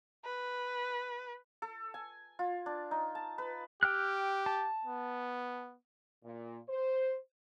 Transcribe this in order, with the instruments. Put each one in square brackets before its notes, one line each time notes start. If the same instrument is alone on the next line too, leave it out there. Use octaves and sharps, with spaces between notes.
[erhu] B4
[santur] A4
G#5
F4
D4
D#4
A5
B4
[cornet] G4 [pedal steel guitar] G5 F6 F#6
[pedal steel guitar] A5
[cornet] B3
[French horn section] A#2
C5